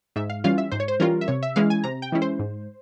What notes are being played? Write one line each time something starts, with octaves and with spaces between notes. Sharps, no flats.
G#2 E5
F5
E3 G3 C#4 F4 F5
E5
G#2 C5
C#5
C5
E3 G3 C#4 F4 A#4
E5
C3 C#5
E5
E3 G#3 C#4 E4 F5
G#5
C3 A#5
G5
E3 G#3 C#4 E4
C5
G#2